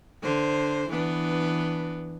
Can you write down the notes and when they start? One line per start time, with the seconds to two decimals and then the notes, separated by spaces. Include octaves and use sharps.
0.23 D3 C5
0.89 E3 B3 D4